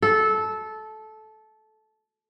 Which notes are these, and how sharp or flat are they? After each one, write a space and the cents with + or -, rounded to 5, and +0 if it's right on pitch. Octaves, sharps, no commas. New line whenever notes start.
A4 -15